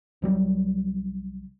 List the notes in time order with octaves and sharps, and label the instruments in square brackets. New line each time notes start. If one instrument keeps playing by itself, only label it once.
[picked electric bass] C2 F#3 G3